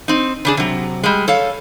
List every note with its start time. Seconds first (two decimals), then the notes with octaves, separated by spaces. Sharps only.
0.08 C4 D#4
0.45 C#3 D4 G#4
0.57 C3 F#3
1.03 G3 G#3
1.28 A4 C#5 F5